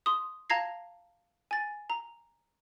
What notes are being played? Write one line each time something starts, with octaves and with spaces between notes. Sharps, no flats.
C6 D#6
F5 A5 A#5 G#6 A#6 C7
G#5 A6
A#5